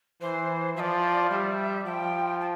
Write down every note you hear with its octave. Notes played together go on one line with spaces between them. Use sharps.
E3 C5
F3 D5 E5
G3 E5
F3 G5
A5